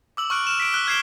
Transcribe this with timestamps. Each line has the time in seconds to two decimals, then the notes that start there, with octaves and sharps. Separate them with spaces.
0.17 D6 E6 F#7
0.30 C#6 F6 F#6 D7
0.47 F6 E7
0.60 B6 D7
0.72 E6 F#6 G7
0.87 F6 G#6 B6 C7 E7 G7